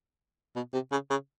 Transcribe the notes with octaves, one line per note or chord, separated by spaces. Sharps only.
B2
C3
C#3
C#3